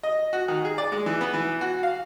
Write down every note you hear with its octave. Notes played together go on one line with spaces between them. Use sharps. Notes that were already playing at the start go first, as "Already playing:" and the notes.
D#5
F#4
D#3
G#4
D5
G#3
E3
B3
E3
F#4
F5